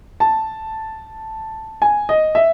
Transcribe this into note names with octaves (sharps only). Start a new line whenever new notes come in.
A5
G#5
D#5
E5